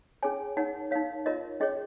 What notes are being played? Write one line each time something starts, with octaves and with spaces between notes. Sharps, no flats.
C#4 G#4 C#5 G#5
D#4 A#4 C#5 F#5
D#4 A#4 C#5 F5
F4 A#4 C#5 D#5
C#4 G#4 C#5 D#5